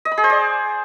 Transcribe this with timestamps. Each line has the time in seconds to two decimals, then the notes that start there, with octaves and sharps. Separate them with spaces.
0.05 D#5
0.11 B5
0.18 G#4
0.24 C5
0.30 D5